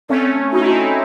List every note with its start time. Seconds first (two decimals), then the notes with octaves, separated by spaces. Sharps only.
0.09 A3 C4 C#4
0.53 D#4 F#4
0.60 E4
0.68 C4 D#4